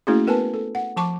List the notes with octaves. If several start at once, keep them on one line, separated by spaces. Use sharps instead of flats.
A3 A#3 C#4 E4 F#4 G#4
B3 A#4 B4 G#5 A5
A4
F#5
F3 A5 C#6 D6